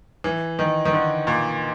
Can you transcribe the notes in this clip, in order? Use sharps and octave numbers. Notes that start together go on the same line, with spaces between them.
E3
D#3
D#3
D3
A#2